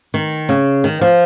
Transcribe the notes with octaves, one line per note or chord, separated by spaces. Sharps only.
D#3
C#3
D#3
F3